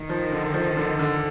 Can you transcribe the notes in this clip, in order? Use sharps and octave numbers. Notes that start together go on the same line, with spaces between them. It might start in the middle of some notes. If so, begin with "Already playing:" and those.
Already playing: D#3
F3
D3
F3
D3
D3